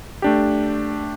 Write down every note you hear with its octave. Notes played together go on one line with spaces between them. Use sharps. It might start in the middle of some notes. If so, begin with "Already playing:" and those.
A3 D4 G4